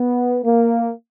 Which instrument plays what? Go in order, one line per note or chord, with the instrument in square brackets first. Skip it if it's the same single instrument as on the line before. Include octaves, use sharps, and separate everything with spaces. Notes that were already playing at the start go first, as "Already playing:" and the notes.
Already playing: [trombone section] B3
A#3